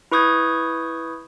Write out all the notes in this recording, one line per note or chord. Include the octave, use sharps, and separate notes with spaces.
E4 B4 C#6 D#6 G6 G#6